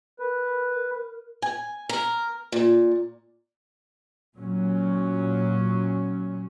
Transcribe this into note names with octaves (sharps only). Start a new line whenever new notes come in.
A#4 B4
G#5
A#4
A#2
A#2 F#3 C#4